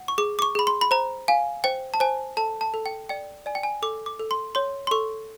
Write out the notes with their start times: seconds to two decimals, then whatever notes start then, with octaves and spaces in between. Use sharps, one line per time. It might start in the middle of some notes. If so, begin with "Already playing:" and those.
Already playing: F#5
0.08 C#6
0.18 G#4 D6
0.39 D6
0.42 C#6
0.55 G#4 B5
0.67 C6
0.81 B5
0.91 C5 A#5
1.28 F5 G#5
1.64 C5 G5
1.94 A5
2.00 C5 G#5
2.37 A4 A5
2.61 A5
2.74 A4
2.86 G5
3.09 D5 G5
3.46 D5 G#5
3.55 G5
3.63 G#5
3.82 A4 D6
4.06 D6
4.20 A4
4.31 C6
4.55 C#5 C6
4.87 C6
4.91 A4 C#6